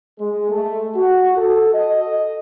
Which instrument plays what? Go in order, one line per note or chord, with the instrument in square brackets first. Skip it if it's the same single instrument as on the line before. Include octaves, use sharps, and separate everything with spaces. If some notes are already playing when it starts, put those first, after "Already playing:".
[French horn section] G#3
A3
F#4
A4
D#5